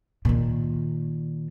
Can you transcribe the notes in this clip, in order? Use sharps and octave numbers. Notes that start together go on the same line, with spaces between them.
A#2 D#3